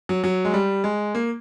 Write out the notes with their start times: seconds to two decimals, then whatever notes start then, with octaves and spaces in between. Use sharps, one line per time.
0.09 F#3
0.24 F#3
0.45 G#3
0.54 G3
0.84 G#3
1.15 A#3